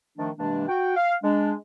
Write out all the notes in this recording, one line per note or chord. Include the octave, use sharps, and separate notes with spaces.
D#3 F3 A3 D4
G2 C3 E3 G#3 A#3 D4
F#4 G5
F5
G#3 D4